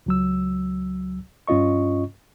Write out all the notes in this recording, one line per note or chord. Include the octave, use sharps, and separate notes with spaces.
C#2 F#3 E6
G2 C#4 F4 D#5 C#6